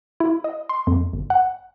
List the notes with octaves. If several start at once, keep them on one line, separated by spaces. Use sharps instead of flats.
E4
D#5
C6
F2
G1
F#5